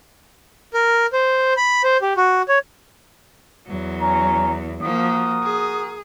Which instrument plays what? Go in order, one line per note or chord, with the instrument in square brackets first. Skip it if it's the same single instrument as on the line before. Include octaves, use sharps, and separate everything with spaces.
[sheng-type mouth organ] A#4
C5
B5
C5
G4
F#4
C#5
[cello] E2 F#3
[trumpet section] C#4 A#5
[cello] F3 A#3 [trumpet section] F#4 A#4 D#6
[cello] G#4